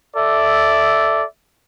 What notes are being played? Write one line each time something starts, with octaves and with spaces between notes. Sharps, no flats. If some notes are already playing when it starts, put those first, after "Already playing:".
A4 D5 E5